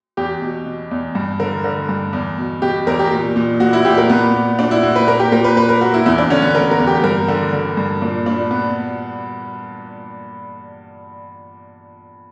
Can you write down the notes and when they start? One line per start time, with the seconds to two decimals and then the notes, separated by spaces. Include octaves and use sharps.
0.17 E2 G4
0.42 B2
0.66 B2
0.91 E2
1.15 G2
1.40 D3 A#4
1.64 D3 A#4
1.89 G2
2.13 E2
2.38 B2
2.62 B2 G4
2.87 E2 A#4
2.99 G4
3.11 A#2
3.36 A#2
3.60 A#2 F#4
3.73 E4
3.85 A#2 G4
3.98 A#4
4.10 A#2 B3
4.34 A#2
4.59 A#2 D4
4.71 E4
4.83 A#2 F#4
4.96 B4
5.07 A#2 A#4
5.19 G4
5.31 A#2 A#4
5.44 B4
5.56 A#2 B4
5.69 A#4
5.81 A#2 F#4
5.94 E4
6.06 E2 E4
6.18 D4
6.30 D3 C#4
6.42 B3
6.55 D3 A#4
6.71 A#4
6.79 E2
6.87 G4
7.04 G2 A#4
7.28 D3
7.53 D3
7.77 G2
8.02 A#2 D4
8.26 A#2 D4
8.51 A#2 B3